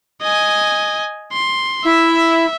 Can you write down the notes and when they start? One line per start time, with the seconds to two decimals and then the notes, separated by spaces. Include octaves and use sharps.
0.22 D#5 G#5
1.33 C6
1.85 E4 E5